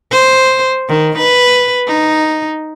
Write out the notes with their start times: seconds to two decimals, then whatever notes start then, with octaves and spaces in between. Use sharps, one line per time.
0.11 C5
0.88 D#3
1.18 B4
1.87 D#4